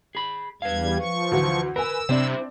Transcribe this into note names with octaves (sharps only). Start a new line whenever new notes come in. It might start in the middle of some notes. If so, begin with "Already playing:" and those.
G#4 B5
E2 G3 B4 F5 G#6
F3 C#6
D2 E3 F#3
A#4 B4 G#5 E6
C3 C4 D4 E4 C5